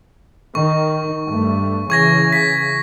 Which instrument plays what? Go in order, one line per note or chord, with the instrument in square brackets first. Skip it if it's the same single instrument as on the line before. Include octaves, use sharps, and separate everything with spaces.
[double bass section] D#3 [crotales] C#6
[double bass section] G2 A3
[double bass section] C#3 E3 [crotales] C#6 G#6 A#6
[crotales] B6